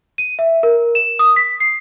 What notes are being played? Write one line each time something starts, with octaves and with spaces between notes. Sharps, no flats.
D#7
E5
A#4
E7
D#6
B6
C7